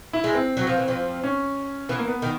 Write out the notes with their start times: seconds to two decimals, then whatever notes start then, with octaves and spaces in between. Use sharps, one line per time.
0.13 E4
0.24 G#2 G#3
0.34 C4
0.57 F#3
0.67 F3
0.78 E3
0.88 F2 F3
1.24 C#4
1.89 E3 B3
1.98 A#3
2.08 B3
2.22 D#3